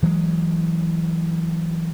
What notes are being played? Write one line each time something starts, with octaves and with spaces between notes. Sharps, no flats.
E3 F#3 G#3